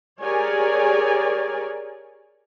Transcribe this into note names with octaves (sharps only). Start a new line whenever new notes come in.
G4 G#4 A#4 C#5 D5 G#5